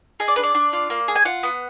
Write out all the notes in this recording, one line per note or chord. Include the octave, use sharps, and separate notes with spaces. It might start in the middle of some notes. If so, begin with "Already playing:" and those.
G#4 D#5
D5
D4 B4
D5
D4
F4
A#3
G#4
G#5
F4 F#5
B3